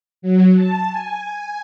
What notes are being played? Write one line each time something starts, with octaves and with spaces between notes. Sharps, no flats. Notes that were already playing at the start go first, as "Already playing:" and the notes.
F#3
A5
G#5